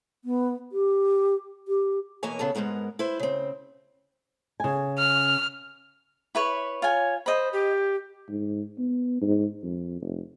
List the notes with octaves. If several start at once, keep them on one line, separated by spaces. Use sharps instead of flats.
B3
G4
G4
B2 E3 A#3 A#4 C#5 G#5
C#3 B3 G#4 A4
G#2 F3 G#3 B3 A#4
E4 B4 C5
C#3 C4
C#3 G#5
F6
E4 B4 C#5
F4 C#5 G#5
C5 D#5 B5
G4
G#2
B3
G#2
F2
F1